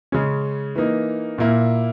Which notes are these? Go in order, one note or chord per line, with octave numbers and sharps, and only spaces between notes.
C#3 G#3 C#4
E3 A#3 D#4
A#2 A#3 E4